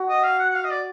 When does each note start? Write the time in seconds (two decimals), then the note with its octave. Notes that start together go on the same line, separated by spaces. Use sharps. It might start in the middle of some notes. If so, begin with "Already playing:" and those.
Already playing: F#4
0.09 D#5
0.24 F5
0.39 F#5
0.50 F#5
0.55 F5
0.64 D#5
0.70 D5